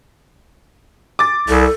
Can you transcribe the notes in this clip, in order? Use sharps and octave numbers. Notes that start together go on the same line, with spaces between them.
D6 A6
C2 A4